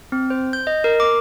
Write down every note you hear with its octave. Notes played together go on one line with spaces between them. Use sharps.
C4
C5
G6
D#5
A#4
D6